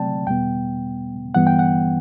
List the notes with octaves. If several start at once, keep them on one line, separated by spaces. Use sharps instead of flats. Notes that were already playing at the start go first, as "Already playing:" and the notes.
Already playing: C3 F#3 A3 C4 D5 G5 A5
E2 B2 G3 B3 G5
G2 E3 G3 B3 F#5
G5
F#5